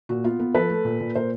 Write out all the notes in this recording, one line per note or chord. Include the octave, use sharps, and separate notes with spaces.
A#2 F#4
B3 F4
B3
F3 A4 B4
A3
A#2
A#2
A#2 A#4 C5